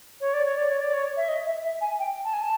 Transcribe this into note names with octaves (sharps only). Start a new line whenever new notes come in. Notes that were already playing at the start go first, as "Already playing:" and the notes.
C#5
D5
C#5
D5
C#5
D5
C#5
E5
D#5
E5
E5
G#5
G5
A5
G#5
A5